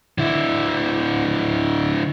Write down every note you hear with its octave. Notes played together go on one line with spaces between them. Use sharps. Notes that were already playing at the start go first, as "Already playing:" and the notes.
D3 E4